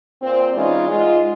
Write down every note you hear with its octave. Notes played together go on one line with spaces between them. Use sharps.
A#2 C4
E3 G#3 C#4 D#4 F4 D5
G#2 G#3 F4